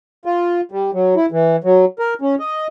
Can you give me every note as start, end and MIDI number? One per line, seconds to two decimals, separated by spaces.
0.25 0.61 65
0.72 0.91 55
0.93 1.15 54
1.16 1.26 64
1.32 1.56 52
1.64 1.85 54
1.99 2.14 70
2.22 2.35 61
2.39 2.67 75